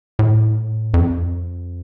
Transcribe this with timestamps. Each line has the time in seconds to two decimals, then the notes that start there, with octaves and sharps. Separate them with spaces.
0.19 A2
0.94 F2